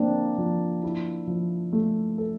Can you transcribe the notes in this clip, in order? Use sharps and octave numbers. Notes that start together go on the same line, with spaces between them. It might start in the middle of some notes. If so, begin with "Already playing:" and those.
Already playing: F3 A#3 C4 D4
F3
E4
F3
A3
A4